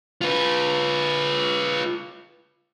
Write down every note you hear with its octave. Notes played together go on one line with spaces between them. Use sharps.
F4 B4